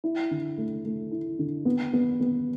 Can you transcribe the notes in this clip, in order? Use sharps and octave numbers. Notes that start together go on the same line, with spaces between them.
E4
D3
A3
A3
E4
D3
B3
B3
B3